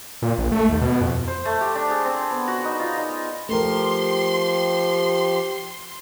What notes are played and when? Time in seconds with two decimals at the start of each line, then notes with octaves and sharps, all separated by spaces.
0.22 A#2
0.38 A#1
0.52 A3
0.69 D#2
0.81 B2
1.01 F2
1.28 C5
1.45 A3
1.61 G4
1.75 D4
1.91 G#4
2.05 C4
2.31 B3
2.48 F#4
2.65 D#4
2.79 F4
2.97 D#4
3.49 F3 A3 G4 A#4 C6